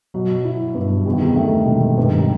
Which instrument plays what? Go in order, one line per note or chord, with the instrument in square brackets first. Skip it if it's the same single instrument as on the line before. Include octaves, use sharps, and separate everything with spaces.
[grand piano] B2 [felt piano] F#3
[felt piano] E4
G2
[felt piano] E2 [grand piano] C3
[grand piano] D#3
C3
[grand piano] D#3 [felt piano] A3
[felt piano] E1 [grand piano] C3
[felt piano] G2 [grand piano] C3
[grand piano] D#3
C3